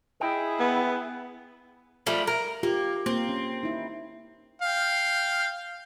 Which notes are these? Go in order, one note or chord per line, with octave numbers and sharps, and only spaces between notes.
E4 G#4 D#5 G5
B3
F3 G3 A3
A#4
A#3 F4 G4
A#3 C4 A#4
C#4
D#4 E4
F5 G5